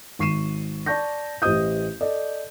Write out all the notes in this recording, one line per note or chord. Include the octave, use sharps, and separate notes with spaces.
G#1 C#6 C7 D#7 E7
D5 A5 C#6 G6 A#6
A1 G4 C5 D#5 D#6 G6
A4 D5 D#5